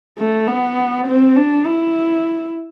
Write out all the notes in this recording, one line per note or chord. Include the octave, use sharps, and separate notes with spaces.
A3
B3
C4
D4
E4